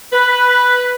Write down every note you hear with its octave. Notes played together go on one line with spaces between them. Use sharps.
B4